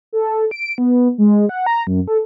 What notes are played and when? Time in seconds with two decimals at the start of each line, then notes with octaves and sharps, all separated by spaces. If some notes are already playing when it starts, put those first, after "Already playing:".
0.13 A4
0.51 D7
0.78 B3
1.18 G#3
1.49 F#5
1.66 A#5
1.87 F#2
2.08 A4